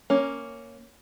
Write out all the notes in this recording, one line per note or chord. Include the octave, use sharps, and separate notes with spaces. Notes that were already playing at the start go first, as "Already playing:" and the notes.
A#3 C#4